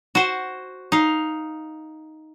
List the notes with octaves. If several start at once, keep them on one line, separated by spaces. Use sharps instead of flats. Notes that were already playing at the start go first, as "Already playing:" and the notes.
F#4 C5
D#4 F5